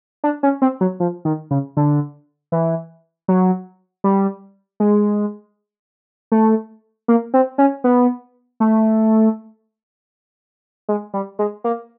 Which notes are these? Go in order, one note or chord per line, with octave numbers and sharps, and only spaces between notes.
D4
C#4
C4
F#3
F3
D#3
C#3
D3
E3
F#3
G3
G#3
A3
A#3
C4
C#4
B3
A3
G#3
G3
G#3
A#3